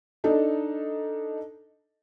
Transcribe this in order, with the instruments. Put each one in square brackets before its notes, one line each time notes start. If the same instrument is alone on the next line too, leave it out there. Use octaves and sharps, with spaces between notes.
[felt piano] D4 D#4 A4